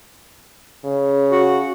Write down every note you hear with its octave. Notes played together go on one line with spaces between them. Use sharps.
C#3
F#4